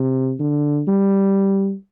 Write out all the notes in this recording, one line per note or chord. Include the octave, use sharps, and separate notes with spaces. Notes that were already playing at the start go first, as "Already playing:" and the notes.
Already playing: C3
D3
G3